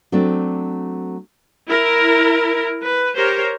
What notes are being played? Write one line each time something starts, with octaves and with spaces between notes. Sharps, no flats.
F#3 A3 C4 D4 D5
E4 A#4
B4
G4 A#4 C5 C#5